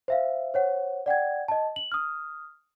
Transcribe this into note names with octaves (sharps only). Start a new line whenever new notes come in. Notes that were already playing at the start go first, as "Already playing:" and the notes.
C5 E5 F5
C5 C#5 F#5
D5 F#5 G5 G#6
D#5 A5
F#7
D#6 F6